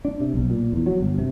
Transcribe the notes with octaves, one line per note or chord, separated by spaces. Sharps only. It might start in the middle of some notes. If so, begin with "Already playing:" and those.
D4
C3
B1
A#2
E2
F#3
G1
C3